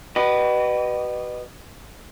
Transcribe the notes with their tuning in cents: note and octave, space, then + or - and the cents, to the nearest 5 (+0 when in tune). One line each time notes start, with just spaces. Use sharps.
F#4 +45 B4 +0 D#5 -35